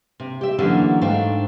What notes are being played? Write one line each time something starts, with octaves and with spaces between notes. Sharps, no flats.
C3
G4 E5
D3 E3 F#3 A3 A#3 C#4
G#2 A3 D4 C5 F5 G5